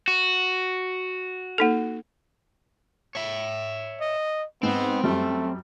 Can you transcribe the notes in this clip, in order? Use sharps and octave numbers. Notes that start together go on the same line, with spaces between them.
F#4
A#3 D#4 A4
C#5 E5
D#5
G#2 B3 C4
F#2 G3 A3